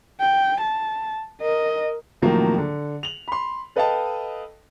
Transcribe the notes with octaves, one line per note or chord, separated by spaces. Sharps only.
G5
A5
A#4 D#5
A2 C3 D#3 F3 F#3 A#3
D3
F7 F#7
B5 C6
A4 B4 D#5 F5 G5 A5